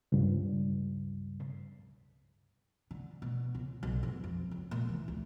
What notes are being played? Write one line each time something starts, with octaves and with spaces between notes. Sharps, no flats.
C#2 G2
D3
B2
C#2
B1
E2
F2
C#2
A#2
E3
D2